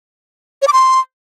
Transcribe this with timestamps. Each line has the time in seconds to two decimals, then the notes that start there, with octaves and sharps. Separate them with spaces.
0.62 C#5
0.67 D6
0.73 C6